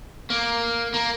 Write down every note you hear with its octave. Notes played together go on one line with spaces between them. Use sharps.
A#3
A#3